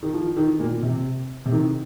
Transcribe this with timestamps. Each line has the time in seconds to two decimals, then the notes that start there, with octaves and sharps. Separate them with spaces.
0.03 D#3
0.13 F3
0.37 D#3
0.60 A#2
0.83 C3
1.46 C3
1.52 D#3